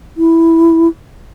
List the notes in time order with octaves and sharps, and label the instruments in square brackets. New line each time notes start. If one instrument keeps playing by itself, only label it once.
[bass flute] E4